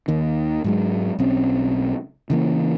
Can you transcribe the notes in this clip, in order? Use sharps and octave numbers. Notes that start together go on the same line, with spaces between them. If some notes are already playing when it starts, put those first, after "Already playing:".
D#2 D#3
G#2 F#3 G#3
B1 C4 C#4
C#3 E3 A#3